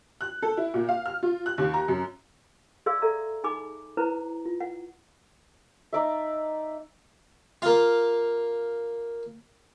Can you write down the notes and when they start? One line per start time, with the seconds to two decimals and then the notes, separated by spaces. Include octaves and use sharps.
0.21 F#6
0.42 A4
0.57 E4
0.74 A#2
0.89 F5
1.06 F6
1.23 F4
1.46 F#6
1.58 D#2
1.74 A#5
1.88 F#2
2.86 G#4 D5 E5 F5 C6 E6
3.02 A4 D5 E5 A#5
3.44 D#4 G#4 G#5 B5 D6
3.97 E4 B4 C5 A#5
4.46 F4
4.61 F#5
5.93 D#4 D5 E5
7.62 A#3 F4